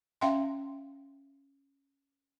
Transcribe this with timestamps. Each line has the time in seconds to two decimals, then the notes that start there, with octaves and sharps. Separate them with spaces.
0.21 C#4 E5 F5 G5 C6